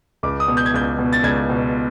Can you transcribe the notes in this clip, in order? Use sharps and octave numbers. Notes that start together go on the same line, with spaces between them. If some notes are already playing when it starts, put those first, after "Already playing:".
C#2 D6
D#6
B2
G6
G#6
C#2 G6
B2
A6
C#2 G#6
B2